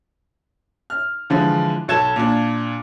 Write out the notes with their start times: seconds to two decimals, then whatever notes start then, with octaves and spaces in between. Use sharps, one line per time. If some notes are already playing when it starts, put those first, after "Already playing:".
0.90 F6
1.30 D3 E3 F3 G#3
1.88 B1 A4 G#6 E7
2.16 A#2 D4